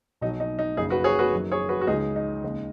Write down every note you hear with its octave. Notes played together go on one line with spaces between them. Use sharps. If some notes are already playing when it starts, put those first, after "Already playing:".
B1 B2 F#3 D#4
D#4
D#4
F#1 F#2 C#3 D#4 G#4
F#4 B4
G#4 C#5
F#4 B4
F#2 D#3 F#3
G#4 C#5
F#4 B4
F#4
C#2 C#3 G#3 D#4 G#4
D#4
D#2 C#3 G#3